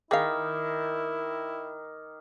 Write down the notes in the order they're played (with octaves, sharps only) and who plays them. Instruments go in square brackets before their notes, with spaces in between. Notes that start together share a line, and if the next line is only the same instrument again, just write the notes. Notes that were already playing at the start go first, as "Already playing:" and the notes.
[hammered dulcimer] D#3 [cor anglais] E4 [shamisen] G#4 F5 [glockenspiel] D6 D#6 F6